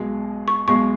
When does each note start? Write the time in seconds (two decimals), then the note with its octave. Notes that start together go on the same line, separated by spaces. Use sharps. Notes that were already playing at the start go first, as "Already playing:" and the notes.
Already playing: B1 B2 G#3
0.48 C#6
0.67 B1 B2 G#3 C#6